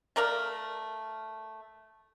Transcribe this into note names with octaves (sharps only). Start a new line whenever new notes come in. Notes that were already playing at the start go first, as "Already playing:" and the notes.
A3 A#4 D5 F5